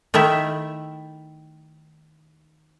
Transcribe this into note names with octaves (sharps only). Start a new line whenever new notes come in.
D#3 A3 E4 E5